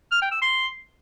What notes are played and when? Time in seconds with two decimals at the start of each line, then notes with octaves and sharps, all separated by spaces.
0.12 F6
0.22 G5
0.32 E6
0.42 C6